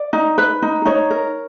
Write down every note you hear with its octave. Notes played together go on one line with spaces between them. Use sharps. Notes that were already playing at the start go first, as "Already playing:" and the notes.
Already playing: D5
D#4
B4
D#4
D#4 C#5
A#4